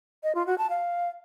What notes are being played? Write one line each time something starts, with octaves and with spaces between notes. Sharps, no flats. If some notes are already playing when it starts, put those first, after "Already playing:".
D#5
F4
F#4
A5
F5